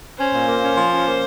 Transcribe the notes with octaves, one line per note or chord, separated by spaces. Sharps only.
C#4 C5
A#2
A#3
C#4
F3
C#4
A#3